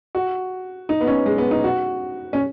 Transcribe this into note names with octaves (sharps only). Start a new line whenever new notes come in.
F#4
D#4
B3
C#4
G#3
B3
D#4
F#4
C#4